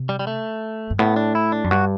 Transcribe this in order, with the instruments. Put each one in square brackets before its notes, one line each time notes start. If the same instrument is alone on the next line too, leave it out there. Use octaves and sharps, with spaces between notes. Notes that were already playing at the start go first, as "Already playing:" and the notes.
Already playing: [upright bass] C3
[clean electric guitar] G3
G3
A3
[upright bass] G2
[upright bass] A2 [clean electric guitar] B3
[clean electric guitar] D4
E4
D4
[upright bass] F#2
[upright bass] G2 [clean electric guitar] F#4